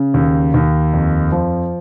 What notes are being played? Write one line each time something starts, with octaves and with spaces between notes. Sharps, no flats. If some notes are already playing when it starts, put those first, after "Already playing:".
Already playing: C#3
D#2
D#2
F2
F3